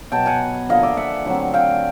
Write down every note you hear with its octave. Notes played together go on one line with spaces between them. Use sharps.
B2 F#3 B3 G5 A5
F#5 G#5
D3 F3 A#3 D#5 F5
D5 E5
E5 F#5
D3 F#3 A3 C4
F5 G5